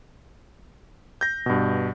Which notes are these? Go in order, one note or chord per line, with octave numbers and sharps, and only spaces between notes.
G6 A#6
G2 B2